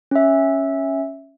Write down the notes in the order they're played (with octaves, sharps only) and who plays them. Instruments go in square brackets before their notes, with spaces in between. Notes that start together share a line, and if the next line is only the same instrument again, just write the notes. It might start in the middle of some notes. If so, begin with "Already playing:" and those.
[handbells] C#4 E5